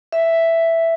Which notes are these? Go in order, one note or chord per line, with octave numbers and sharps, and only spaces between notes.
E5